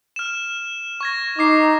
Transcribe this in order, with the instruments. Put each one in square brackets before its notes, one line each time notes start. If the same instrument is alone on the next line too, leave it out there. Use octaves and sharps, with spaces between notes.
[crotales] F6 E7
C#6 G#6 A#6
[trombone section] D#4 [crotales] D6 C7